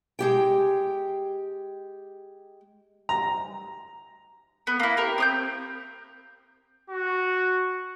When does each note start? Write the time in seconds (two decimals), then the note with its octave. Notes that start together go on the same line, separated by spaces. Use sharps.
0.19 G#3 G4 G5
3.09 A#5
4.67 B3
4.80 A#3 E4
4.97 G4 A#4
5.18 C4 D#6 G6
6.90 F#4